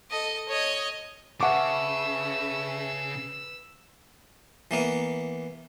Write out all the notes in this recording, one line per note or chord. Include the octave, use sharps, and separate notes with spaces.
A4 D#5
C#5 D#5
C#3 B4 E5 F#5 A5 C#6 D6 E6
E3 A#3 B3